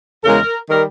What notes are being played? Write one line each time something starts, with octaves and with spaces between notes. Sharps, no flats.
E2 C#3 G#3 A#4
D#3 G3 A#4